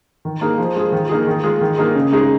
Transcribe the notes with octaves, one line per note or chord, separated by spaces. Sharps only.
D#3
A#3 D#4 G#4
F3
G#3 F4 G#4
D#3
A#3 D#4 G#4
D#3
G#3 F4 G#4
D#3
A#3 D#4 G#4
C#3
G#3 D#4 G#4